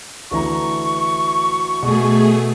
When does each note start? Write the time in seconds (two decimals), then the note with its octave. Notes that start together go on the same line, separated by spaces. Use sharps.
0.31 D2 E3 A#5 C#6
1.83 B2 A3 G#4